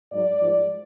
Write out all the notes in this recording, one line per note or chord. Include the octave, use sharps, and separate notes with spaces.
G#2 F#3 D5
G#2 F3 G#3